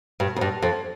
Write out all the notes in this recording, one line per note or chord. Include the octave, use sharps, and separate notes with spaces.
G2
F2
G2
F2